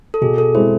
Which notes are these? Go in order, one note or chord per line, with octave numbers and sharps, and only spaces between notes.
A4
B2 G#4
A4
G#3 C4 E4 C5